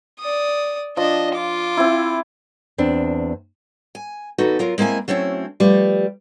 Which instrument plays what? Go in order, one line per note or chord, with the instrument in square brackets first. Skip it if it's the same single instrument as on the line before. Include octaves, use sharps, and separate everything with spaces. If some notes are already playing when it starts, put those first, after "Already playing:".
[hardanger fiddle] D5 D#6
[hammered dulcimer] F3 [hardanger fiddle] D4 D#5
[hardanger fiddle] F4 D6
[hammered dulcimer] C4 E4
[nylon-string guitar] E2 C4 D4
[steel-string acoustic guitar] G#5
E2 D#4 F#4 A4 B4
F#3 F4 A#4
G#3 A#3 C4 E4 G#5
F#3 A3 C4 C#4 E4
F3 G3 A3 B4